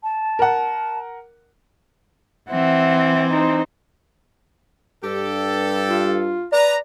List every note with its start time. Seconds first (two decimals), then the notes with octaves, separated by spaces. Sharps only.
0.03 A5
0.39 A#4 F#5
2.50 E3 C4 E5 F#5
3.30 D#4 C5
5.03 G2 G4 A4
5.89 F4
6.52 B4 D5 A#5